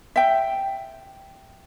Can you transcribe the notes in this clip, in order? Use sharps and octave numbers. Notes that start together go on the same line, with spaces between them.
E5 G5